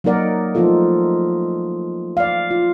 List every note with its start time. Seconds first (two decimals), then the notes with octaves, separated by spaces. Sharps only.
0.04 F#3 A#3 D#4 A#4 D5 F#5
0.55 F3 A3 D#4 F4 A4
2.17 D5 F5
2.51 F4